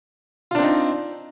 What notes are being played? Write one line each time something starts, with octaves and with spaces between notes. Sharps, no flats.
C4 D4 D#4 F4